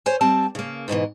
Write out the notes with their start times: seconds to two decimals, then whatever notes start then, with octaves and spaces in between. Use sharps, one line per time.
0.06 C5 C#5 G#5
0.21 G3 C4 A5
0.55 C#3 A#3
0.88 G#2 B2 D3 E3